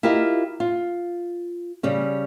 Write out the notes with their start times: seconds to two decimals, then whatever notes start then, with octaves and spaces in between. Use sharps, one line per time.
0.03 E4 F4 G4 A#4 D#5 F5
0.60 F4
1.83 C#3 G3 C#4